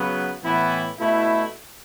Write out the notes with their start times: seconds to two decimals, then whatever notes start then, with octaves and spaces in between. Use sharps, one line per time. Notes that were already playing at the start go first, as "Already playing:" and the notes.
Already playing: C#3 F#3 B3
0.43 A2 E3 B3 E4
1.00 B2 A3 E4